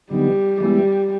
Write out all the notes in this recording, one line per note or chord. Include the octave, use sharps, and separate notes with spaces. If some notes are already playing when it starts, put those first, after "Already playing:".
D3 F#3 G3 B3 D#4
E3 G3 G#3 B3 E4